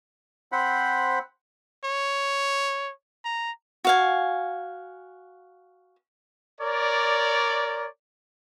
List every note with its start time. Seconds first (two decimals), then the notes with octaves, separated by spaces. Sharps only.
0.52 C4 C5 F#5 B5
1.85 C#5
3.25 A#5
3.85 F#4 F5 G#5
6.60 A#4 C#5 D5